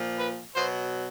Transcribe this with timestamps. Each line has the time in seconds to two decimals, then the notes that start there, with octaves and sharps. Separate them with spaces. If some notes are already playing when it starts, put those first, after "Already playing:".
Already playing: A#2 F3
0.17 B4
0.55 B2 F#3 C5